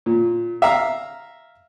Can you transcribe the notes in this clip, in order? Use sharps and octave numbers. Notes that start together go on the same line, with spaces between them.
A#2
E5 F5 A#5